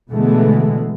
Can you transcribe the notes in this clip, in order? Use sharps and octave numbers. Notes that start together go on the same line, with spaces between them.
B2 D3 E3 G#3 A3 B3